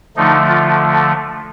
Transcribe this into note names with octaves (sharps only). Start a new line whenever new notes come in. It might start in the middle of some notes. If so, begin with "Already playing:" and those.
D3 F3 A3 D#4
F4